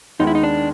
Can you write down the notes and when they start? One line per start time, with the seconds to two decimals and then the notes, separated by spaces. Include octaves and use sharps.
0.19 D#2 D#3 G#3 B3 D#4
0.27 E4
0.35 D#4
0.43 D4